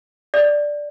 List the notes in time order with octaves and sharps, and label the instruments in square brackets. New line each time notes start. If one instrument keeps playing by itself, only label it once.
[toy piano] D5